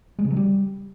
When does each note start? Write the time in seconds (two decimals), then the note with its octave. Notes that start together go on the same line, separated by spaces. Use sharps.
0.19 G#3
0.25 C#3
0.31 F#3
0.37 G3